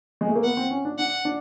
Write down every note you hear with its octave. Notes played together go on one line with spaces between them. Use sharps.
G#3
A3
A#3
B3 F#5
C4
C#4
D4
D4 F#5
D4